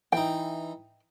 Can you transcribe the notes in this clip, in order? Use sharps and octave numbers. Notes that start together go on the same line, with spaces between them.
E3 D#4 G5